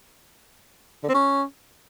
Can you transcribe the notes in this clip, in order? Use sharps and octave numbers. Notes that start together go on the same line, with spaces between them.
D3
C4
C#4